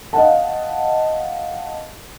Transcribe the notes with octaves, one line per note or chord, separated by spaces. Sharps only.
D#5 F5 F#5 A5